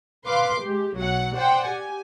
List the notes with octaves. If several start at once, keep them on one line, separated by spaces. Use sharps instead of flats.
B4 F5 C6 D6
G#3 G4
B1 F#3 F#5
C5 D5 F#5 G5
G4 G#5